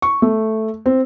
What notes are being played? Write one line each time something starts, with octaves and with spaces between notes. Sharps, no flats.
C#6
A3
C4